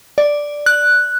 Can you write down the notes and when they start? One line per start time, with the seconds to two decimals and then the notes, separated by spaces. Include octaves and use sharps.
0.18 D5
0.66 F#6